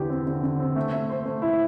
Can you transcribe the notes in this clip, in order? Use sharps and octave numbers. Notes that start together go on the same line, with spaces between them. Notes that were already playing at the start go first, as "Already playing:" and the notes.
Already playing: E2 D3 G4
C4
D3
D3
C4
A3
A3
C5
A3
E4